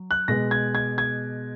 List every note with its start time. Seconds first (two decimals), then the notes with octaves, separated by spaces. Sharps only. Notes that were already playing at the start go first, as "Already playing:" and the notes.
Already playing: F#3
0.11 F#6
0.28 B2 G#3 B3 A#6
0.51 G#6
0.75 G#6
0.98 G#6